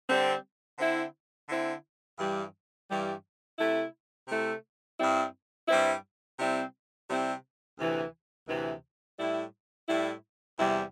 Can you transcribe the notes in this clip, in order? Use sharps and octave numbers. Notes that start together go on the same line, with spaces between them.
D3 G3 C4
D3 C4 E4
D3 C4 E4
G2 E3 G3
G2 E3 G3
C3 A3 E4
C3 A3 E4
G2 G3 C4 E4
G2 G3 C4 E4
C3 G3 C4 E4
C3 G3 C4 E4
D2 C3 E3
D2 C3 E3
A2 G3 E4
A2 G3 E4
E2 C3 G3 E4